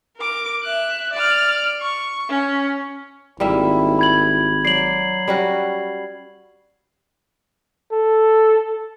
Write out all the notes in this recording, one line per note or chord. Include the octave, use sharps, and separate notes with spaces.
A#4 D6
E5 F#6
D5 F6
C#6
C#4
G#1 G3 A#3 E4 E5
B5 G#6 F#7
F#3 D5 C7 F#7
G3 C#4 F#4
A4